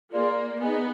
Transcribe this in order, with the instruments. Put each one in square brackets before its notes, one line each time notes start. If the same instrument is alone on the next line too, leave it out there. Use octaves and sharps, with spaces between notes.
[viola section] A#3 [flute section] F4 G#4 D5
[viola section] B3 [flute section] D#4 G#4 D#5 G#5